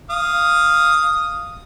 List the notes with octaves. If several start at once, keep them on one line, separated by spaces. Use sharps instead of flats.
F5 D#6